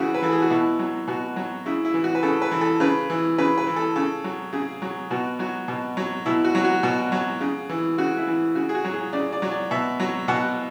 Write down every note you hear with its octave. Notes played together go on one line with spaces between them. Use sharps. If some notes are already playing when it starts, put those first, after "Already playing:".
Already playing: C#3 E3 E4 F#4
B4
E3 A4
G#4
F#4
B2 E4
F#3
B2 F#4
F#3
C#3 E4
E4
E3
F#4
B4
C#3 A4
B4
E3
A4
C#3 B4
E3
C#3 B4
B4
E3
A4
C#3 A4
F#3
C#3 G#4
F#3
B2 F#4
F#3 F#4
B2
F#3
B2 E4
F#4
F#3
F#4
B2 F#4
F#3
C#3
E3
C#3 F#4
E4
E3
C#3 F#4
G#4
F#4
F#3
G#4
C#3 D5
D5
F#3
D5
B2 E5
F#3
B2 F#5